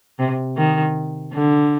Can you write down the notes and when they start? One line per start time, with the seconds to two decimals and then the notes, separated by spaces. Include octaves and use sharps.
0.19 C3
0.57 D#3
1.33 D3